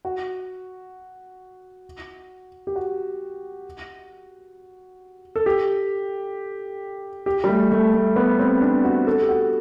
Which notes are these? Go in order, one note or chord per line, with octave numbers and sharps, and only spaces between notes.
F#4
G4
F#4
A4
G4
G4
G3
A3
A3
A3
B3
C4
D4
F#4
A4
G4
F#4